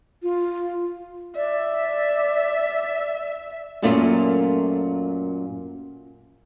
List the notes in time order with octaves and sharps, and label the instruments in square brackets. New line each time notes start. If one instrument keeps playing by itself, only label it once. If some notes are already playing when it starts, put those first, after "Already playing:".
[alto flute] F4
[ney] D5 [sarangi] E5
[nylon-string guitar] F#2 A#2 A3 A#3 C#4 F4